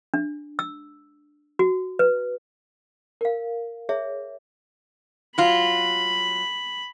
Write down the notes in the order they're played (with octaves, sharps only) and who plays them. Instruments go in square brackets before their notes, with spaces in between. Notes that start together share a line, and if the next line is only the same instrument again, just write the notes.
[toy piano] D4
E6
F#4
B4
A#4 F5
G#4 C#5 E5
[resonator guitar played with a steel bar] F#3 F4 [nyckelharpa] B5